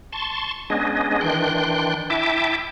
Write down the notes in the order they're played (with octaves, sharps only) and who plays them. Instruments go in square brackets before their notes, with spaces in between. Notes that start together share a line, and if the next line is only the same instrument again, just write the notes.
[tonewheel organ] A5 C6 C#6
G#3 B3 C#4 D4 G#4 D#5
D#3 E3 D4 G5 C6 F#6
E4 E5 G5 A5 D6